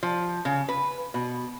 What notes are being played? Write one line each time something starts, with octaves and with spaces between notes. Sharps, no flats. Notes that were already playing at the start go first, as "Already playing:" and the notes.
F3
C#3
B4
B2